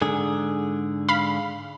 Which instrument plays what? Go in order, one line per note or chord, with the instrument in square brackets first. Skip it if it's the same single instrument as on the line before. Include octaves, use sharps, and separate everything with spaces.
[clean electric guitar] G#2 D3 G#4
[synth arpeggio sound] F5 B5